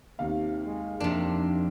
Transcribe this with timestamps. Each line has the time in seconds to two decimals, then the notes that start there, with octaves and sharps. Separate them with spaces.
0.19 D#2 C3 F5
0.66 G#3
1.00 F2 C3 A#3 D4